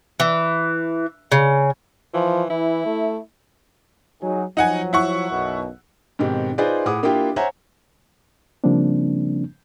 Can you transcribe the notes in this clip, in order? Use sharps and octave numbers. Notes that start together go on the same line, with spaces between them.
E3
C#3
E3 F3
E3 E4
A3
F#3 D#4 G#4
F3 F#3 D#4 F#5 G#5
E4 F#5 C#6
B1 F#2 B2
G#2 B2 D#3 C4 G4
D#4 F4 G#4 B4 C5 D5
A2 G#4 F#5 D6 D#6
A#3 D4 E4 F4 G4 G5
C5 C#5 E5 F#5 G#5 A#5
C#3 F3 G3 A#3 C4 D4